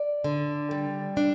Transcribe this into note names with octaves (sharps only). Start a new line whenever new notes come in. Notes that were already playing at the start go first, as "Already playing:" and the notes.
Already playing: D5
D3
G3
D4